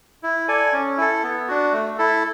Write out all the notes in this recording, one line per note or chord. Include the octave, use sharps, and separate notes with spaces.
E4
A4 D5 G#5
C#4
E4 A4
B3
D4 F#4
A3
E4 A4